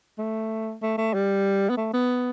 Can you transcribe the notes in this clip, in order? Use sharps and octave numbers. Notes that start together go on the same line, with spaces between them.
A3
A3
A3
G3
B3
A3
B3